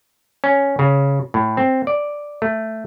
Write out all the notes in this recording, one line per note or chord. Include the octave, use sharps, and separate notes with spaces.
C#4
C#3
A2
C4
D5
A3